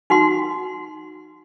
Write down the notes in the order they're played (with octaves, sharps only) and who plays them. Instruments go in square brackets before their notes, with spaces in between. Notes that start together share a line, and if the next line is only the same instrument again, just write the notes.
[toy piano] D#4 F#4 F#5 C6